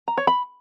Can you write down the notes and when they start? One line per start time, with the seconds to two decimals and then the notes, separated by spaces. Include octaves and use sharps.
0.08 A#5
0.18 C#5
0.27 B5